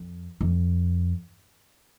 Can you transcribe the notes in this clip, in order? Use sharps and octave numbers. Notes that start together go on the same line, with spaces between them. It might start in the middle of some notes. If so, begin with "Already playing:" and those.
Already playing: F2
F2